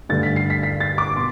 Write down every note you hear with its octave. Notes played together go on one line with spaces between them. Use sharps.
G2 D3 A3 A6
B6
C7
B6
B6
A6
D6
B2 C6